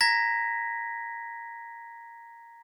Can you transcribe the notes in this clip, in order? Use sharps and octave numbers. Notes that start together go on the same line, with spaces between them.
A#5 G#6 A#6 B6